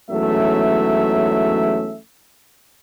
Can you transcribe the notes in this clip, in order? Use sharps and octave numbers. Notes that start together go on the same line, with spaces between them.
E2 G#2 F#3 A3 C#4 E5